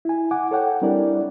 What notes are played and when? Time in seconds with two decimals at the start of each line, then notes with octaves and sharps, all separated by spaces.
0.05 E4 G#5
0.31 F#5 G#5 D6
0.51 A4 C#5 F#5 G5
0.82 G3 C4 D4 E4 A#4 D5